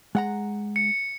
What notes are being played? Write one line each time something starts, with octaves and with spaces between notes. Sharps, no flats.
G#3 F#5 A#5
C#7